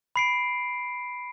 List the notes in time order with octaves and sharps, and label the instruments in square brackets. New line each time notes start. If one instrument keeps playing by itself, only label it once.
[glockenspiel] B5 C7 D7